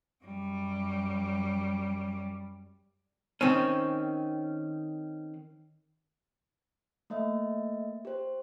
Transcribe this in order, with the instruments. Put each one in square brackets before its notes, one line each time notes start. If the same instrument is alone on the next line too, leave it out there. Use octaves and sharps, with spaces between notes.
[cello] F#2 G3
[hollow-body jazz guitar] D#3 C4 C#4
[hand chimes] A3 A#3 D#5 E5
G4 C5